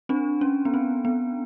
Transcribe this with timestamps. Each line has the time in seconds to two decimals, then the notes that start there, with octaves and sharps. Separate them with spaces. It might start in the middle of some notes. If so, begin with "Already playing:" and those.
0.09 C4 D4
0.41 C#4
0.65 B3
0.74 C4
1.05 B3